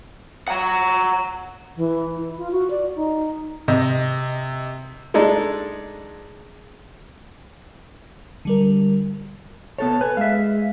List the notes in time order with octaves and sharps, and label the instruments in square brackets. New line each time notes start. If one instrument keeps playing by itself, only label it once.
[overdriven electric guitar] F#5 A#5
[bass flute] E3
E4
F4
F#4
D5
D#4
[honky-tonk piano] C3 D#5
[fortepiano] G#3 D4 D#4 A4
[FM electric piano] D3 G3 A#4
[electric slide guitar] B3 A4 C#5 [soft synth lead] A5
[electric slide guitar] B4 [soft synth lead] G#5
[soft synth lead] G#3 [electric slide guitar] E5 F5